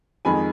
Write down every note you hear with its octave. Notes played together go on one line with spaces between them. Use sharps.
F2 D#3 G#3 G#5 B5